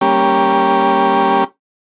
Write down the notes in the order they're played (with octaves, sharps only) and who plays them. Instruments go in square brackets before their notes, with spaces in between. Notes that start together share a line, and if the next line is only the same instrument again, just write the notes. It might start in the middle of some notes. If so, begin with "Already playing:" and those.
[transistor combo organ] G3 A#3 C#4 G4